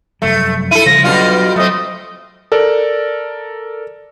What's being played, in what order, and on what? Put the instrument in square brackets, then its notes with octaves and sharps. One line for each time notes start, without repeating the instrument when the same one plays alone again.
[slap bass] F1 F#2 G3 [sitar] A3
[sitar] E4 A4 [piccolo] D#7
[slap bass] C#3 G3 [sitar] F3 [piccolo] A#6
[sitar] B2 G3 F4 [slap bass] F#3 D4 [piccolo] F6
[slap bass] F#3 [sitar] A3 C4 [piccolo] D#5
[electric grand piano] A4 A#4 D5